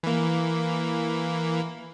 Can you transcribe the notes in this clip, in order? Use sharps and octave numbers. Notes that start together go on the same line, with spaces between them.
E3 A#3